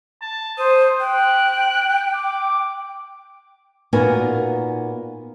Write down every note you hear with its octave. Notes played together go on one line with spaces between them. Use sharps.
A5
C5 D#6
G5 F#6
D6
A#2 B3 D#4 F#4 A#4 G#5